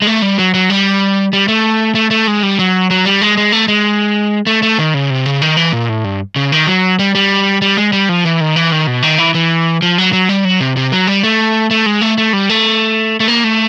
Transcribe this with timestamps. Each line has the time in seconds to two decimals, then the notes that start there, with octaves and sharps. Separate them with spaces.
0.02 G#3
0.07 A3
0.22 G3
0.39 F#3
0.54 F#3
0.70 G3
1.33 G3
1.48 A3
1.95 A3
2.11 A3
2.27 G#3
2.43 G3
2.59 F#3
2.90 F#3
3.05 G3
3.21 G#3
3.37 G#3
3.52 A3
3.68 G#3
4.47 A3
4.62 A3
4.79 D#3
4.94 C#3
5.10 C3
5.26 C#3
5.42 D#3
5.57 E3
5.73 A#2
5.89 A2
6.04 G2
6.36 C#3
6.52 D#3
6.67 F#3
6.99 G3
7.15 G3
7.62 G3
7.77 G#3
7.93 G3
8.09 F3
8.25 E3
8.41 D#3
8.56 E3
8.72 D#3
8.87 B2
9.03 D#3
9.18 E3
9.34 E3
9.82 F3
9.98 F#3
10.13 F#3
10.29 G3
10.45 F#3
10.60 C3
10.76 C3
10.92 F#3
11.07 G3
11.23 A3
11.71 A3
11.86 G#3
12.01 A3
12.18 A3
12.33 G3
12.49 A3
13.20 A3
13.28 A#3
13.44 A3